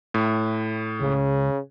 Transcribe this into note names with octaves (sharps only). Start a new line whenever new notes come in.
A2
C#2 C#3